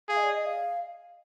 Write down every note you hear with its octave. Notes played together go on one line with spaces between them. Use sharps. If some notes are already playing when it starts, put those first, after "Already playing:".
G#4 F5
D#5
D5
D#5
F5